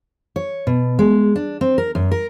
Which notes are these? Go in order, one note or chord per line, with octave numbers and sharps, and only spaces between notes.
C#5
B2
G#3
D4
C4
A#4
F#2
A#4